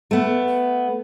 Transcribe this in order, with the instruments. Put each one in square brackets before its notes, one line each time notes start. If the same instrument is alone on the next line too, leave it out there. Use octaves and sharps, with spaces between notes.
[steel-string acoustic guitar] A3 B3